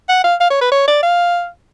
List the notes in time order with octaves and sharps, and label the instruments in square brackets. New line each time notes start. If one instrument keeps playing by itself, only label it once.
[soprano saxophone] F#5
F5
F5
C#5
B4
C#5
D5
F5